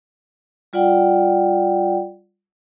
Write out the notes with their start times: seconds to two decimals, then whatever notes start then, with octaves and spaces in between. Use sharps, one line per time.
0.73 G3 F4 D5 F#5 G5